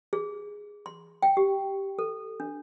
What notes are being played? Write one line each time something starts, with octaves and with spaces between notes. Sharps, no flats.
G#4
C6
G5
G4
A4
D4